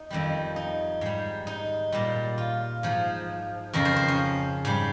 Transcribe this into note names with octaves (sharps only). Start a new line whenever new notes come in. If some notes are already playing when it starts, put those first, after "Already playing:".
Already playing: D#4
F2 D#3 G3
D#4
G#2 G3
D#4
A#2 G3
F4
G#2 F3
F2 C#3 F3 A#4
C5
C5
C#4
G#2 G3